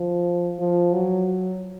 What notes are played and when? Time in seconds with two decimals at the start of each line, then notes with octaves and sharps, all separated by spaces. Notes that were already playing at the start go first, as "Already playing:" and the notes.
Already playing: F3
0.59 F3
0.93 F#3